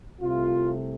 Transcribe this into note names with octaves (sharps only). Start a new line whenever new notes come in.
C2 C3 A3 F4